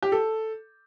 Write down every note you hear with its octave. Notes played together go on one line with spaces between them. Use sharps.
G4
A4